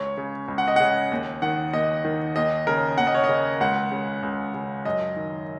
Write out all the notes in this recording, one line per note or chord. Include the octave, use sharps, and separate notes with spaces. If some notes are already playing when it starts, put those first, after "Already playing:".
Already playing: C#2 C#5
C#3
C#2
F#5
D#5
C#3 F#5
D#2
D#3 F#5
D#2 D#5
D#3
D#2 D#5
C#3 A#4
D#2 F#5
D#5
C#5
C#3 D#5
C#2 F#5
C#3
C#2
C#3
F#2 D#5
D#3